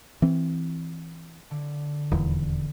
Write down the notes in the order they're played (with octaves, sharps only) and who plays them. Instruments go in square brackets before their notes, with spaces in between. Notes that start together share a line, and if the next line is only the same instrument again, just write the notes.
[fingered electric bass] E3 C4
[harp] D3
[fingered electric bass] D#1 E2